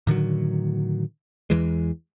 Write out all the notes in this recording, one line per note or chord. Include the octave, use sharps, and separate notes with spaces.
A2 D3 D#3 F#3
E2 E3 G#3